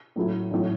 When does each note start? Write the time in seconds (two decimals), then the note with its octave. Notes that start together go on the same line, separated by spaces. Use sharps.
0.16 A2 F#3 A3 E4
0.51 A1 A2 F#3